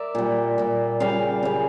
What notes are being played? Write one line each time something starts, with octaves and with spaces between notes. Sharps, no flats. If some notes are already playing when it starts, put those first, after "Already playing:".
Already playing: A#4 D5 E5
A#2 G3
A#2 G3
C#3 G3 F5
C#3 G3